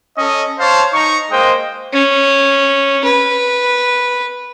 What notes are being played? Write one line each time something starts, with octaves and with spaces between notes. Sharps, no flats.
C#4 A4 D#5
C5 C#5 F5 A5
D#4 A#5 C#6
G#3 A#3 C5 D#5 G5
C#4
B4